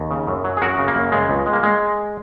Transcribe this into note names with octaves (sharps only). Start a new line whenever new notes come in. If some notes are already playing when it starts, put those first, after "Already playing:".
Already playing: D#2
C#3
F#2
F#3
G#4
F#2 F#4 A#4
C#3
A#3
F#2
C#3 G#3
C#2
G#3
A#3
G#3